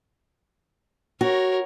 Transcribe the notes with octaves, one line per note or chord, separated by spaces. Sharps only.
F#4 A#4 C#5